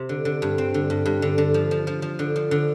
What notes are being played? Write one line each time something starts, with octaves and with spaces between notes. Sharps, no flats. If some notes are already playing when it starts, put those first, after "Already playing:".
Already playing: C3 C4 C5
D3
D3
G2
C4
D3
G2
G2
D3
D3
F3
F3
F3
F3
D3
F3
D3